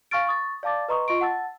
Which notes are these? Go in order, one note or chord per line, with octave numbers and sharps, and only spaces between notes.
F5 G#5 C#6 F6 A6 D7
C#6 D#6 A6
D5 F5 A5 D6 A6
B4 D#5 A#5 C6 C#6 D#6
F4 D#5 C6 C#6 D7
F#5 A5 E6 A6